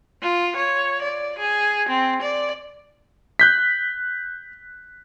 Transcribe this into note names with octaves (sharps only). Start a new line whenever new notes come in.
F4
C#5
D5
G#4
C4
D5
F#6 G6 B6